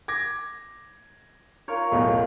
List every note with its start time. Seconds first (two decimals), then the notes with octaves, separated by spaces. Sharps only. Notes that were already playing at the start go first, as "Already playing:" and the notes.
0.08 D6 G#6 A#6
1.68 F4 A#4 C#5
1.92 B1 E2 A2